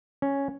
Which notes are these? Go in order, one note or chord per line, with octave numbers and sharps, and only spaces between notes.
C#4